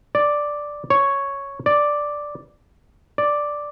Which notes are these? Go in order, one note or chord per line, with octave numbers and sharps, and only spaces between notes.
D5
C#5
D5
D5